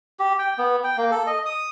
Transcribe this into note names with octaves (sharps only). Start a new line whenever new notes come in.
G4
G5
B3
G5
A#3
A4
D#5
D#6